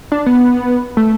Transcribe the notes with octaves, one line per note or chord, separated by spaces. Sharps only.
D4
B3
A3